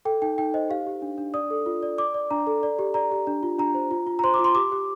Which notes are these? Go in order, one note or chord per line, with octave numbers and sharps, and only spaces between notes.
A4 G5
D#4 G5
D#4 G5
C5 D#5
G4 F5
G4
D4
D4
D5 D#6
A4
F4
D5
D5 D6
D5
D4 A#5
A4
D5
G4
D5 A#5
G4
D4
F4
D4 A#5
C5
F4
F4
A#5
C5 C6
D6
F4
C6
G4 D6
G4